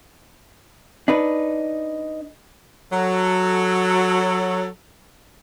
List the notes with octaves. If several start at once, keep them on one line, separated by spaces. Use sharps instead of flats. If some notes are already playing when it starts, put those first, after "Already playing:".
D4 D#4 B4
F#3 A4